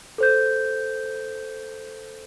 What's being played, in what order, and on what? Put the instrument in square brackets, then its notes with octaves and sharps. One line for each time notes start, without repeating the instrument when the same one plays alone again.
[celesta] A4 C5 G6